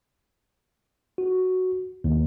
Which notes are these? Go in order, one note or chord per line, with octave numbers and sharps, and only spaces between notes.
F#4
D#2